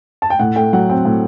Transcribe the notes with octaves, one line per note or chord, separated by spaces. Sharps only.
A5
G5
A2 F#5
A3 G5
F#3 F#5
C4 G5
A2